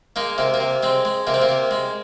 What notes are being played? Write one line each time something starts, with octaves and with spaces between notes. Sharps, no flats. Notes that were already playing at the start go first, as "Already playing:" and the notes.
G#3 A#3 D#4
C3 A#3
A#3
C3
G#3 C4
G#3
C3 A#3
C4
A#3
C3
G#3